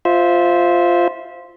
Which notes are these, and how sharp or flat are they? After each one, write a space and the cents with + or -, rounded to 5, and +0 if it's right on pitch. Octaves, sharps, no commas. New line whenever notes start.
F4 +0 C5 +0 E5 -20